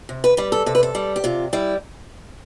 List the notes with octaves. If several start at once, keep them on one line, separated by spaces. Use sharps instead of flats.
C3
B4
G3 B4
A4
C3 A4
B4
A4
G3
G4
C3 F4
G3 E4